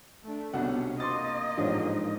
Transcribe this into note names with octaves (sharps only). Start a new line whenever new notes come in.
A3 D4
C2 B2 C#4 D4 F#5
A#3 D#5 C6 D6 A6
A1 G#2 F3 D4 G4 C#5